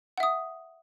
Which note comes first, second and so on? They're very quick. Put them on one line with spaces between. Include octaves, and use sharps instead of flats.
F#5 E5 D#6